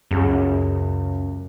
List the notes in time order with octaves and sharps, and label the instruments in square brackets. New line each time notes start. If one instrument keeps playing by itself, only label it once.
[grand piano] C#2 C#3 [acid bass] F#2